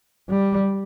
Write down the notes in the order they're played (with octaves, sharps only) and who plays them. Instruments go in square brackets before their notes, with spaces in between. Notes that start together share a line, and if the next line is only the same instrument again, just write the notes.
[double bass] G3